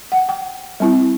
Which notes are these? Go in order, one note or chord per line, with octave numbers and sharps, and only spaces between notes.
F#5
G5
G3 C4 E4